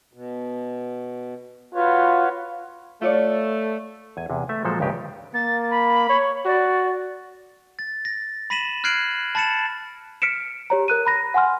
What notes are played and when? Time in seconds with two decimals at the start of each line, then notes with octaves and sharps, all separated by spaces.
0.13 B2
1.74 F4 F#4 B4 C#5
3.02 A3 F4 C#5 D5
4.17 E2 G#5
4.30 E2 C3
4.49 A3 E5
4.65 A#2 F3 F#3 G#3 A4 C5
4.80 C#2 G2 C#3 G4 A#4 G#5
5.34 A#3 A6
5.70 B5
6.09 C#5
6.46 F#4 D5
7.79 A6
8.05 A#6
8.50 B5 A#6 B6 D#7 E7 F#7
8.84 F6 F#6 G#6 C7 D7 F#7
9.35 A5 B5 A6 C#7 E7
10.22 F6 B6 C#7 D7 E7
10.70 G4 C#5 A#5
10.88 A#4 F#6 D#7
11.06 A#5 B5 A#6
11.34 F#5 G#5 C6 F6